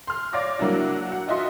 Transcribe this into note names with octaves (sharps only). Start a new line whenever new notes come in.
C6 F6
C#5 D5 F5 D6 A#6
F#3 A#3 D4 E4 F#4
F#5
D#4 F4 F#4 D#5 E5 C6